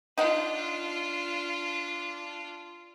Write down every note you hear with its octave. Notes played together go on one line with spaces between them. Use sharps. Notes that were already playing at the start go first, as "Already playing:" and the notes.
D4 D#4 F4 F#5